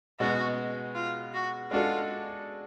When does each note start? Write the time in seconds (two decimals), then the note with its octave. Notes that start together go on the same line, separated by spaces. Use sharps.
0.20 B2 G#3 B3 F#4
0.95 F4
1.34 F#4
1.71 G#3 D4 F4 F#4 A4